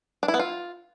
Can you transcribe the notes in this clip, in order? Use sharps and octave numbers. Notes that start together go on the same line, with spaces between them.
D4
E4
B3
F4